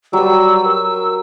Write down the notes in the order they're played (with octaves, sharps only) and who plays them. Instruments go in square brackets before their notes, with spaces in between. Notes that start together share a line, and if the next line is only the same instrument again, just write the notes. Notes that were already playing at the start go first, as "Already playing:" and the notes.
[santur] F#3 B4 [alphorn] G3 [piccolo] E6
[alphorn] A#4